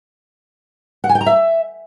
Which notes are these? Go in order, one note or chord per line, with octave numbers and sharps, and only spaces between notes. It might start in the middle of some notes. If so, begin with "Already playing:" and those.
F#5
G#5
G5
A#5
E5